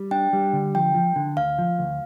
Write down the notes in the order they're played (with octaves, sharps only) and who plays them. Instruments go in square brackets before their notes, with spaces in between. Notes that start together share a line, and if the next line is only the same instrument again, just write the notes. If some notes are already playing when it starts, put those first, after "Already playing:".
Already playing: [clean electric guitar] G3
[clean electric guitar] D4 [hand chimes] G5
[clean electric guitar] G3
D3
[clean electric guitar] F3 [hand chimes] G5
[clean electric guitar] F3
D3
[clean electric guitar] D2 [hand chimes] F5
[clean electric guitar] F3
D2